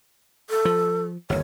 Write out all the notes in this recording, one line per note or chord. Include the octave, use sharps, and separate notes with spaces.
A4
F3
G1 D#2 C#5